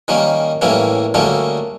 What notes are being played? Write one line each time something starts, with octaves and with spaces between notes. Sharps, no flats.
D#3 G3 A#3 C#4
A2 E3 G3 A#3 C#4
D2 D3 G3 A#3 C#4